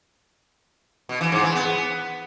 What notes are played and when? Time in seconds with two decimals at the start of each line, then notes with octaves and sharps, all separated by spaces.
1.09 B2
1.21 E3
1.32 G#2
1.44 E3
1.55 B3